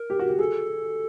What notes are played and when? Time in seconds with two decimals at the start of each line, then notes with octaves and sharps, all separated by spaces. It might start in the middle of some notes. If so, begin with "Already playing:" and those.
Already playing: A#4
0.10 G4
0.19 F#4
0.28 G4
0.39 G#4 A4